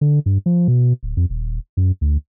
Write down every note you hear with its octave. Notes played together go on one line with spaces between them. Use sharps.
D3
G2
F3
B2
D1
F2
D#1
F#2
D2